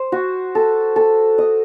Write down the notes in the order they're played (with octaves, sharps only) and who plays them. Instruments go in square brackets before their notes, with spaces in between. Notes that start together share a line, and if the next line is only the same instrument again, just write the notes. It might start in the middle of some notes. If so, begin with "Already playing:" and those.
Already playing: [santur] C5
F#4
A4
A4
D#5